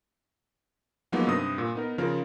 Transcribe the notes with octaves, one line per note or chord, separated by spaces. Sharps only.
F3 F#3 G#3 A#3 B3 D#4
G2 C3 D#6 A#6
A#2
B3 D#4 A#4
C#3 F3 F4 A#4